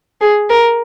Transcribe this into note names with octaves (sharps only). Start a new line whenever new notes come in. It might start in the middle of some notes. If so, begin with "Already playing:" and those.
G#4
A#4